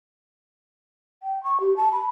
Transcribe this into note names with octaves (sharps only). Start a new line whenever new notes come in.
G5
C#6
G4
A5
B5